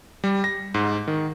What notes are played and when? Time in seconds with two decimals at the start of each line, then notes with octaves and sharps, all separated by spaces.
0.24 G3
0.44 A#6
0.74 G#2
1.08 D#3